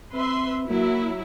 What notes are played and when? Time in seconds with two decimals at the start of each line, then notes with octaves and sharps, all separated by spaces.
0.14 C4 B4 E5 C6
0.69 F#3 A#3 E4